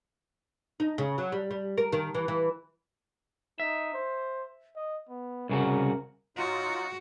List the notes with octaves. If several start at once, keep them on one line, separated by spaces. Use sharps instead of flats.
D#4
C#3
F#3
G3
G3
A#4
D#3
E3
E3
D#4 E5
C5
D#5
B3
C2 C#3 F#4 A#4
F#3 D#4 F4 F#4